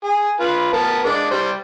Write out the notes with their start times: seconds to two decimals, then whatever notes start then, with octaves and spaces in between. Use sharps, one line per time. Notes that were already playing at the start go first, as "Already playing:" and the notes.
0.04 G#4
0.40 F4 B4
0.73 B3 A#4 A5
1.04 G#3 D4
1.31 G3 C5